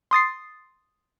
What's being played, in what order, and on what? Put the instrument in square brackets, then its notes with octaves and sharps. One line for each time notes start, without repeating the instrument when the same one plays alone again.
[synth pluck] C6 D#6 A6 C7